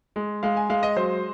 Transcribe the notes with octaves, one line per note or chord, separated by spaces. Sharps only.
G#3
G#3 F5
G#5
G#3 F5
D#5
F#3 C5